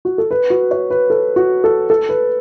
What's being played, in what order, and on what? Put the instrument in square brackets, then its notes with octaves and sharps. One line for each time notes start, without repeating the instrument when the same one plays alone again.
[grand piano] F#4
A4
B4
F#4
C#5
B4
A4
F#4
A4
A4
B4